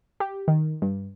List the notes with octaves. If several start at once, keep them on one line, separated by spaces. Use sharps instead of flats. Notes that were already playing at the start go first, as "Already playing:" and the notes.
G4
D#3
G2